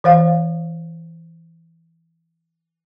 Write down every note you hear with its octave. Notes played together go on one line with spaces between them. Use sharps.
E3 C5 F5